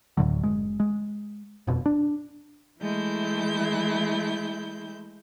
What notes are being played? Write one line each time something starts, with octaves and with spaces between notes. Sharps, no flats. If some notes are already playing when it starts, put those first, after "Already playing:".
D2 A2 D3 F#3
F#1 G#3
G#3
D#1 F2 B2
D4
E3 G#3 A3 E4 G6